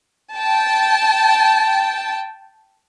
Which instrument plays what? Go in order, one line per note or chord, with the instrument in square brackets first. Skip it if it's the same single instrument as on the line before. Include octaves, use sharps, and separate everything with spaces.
[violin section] G5 A5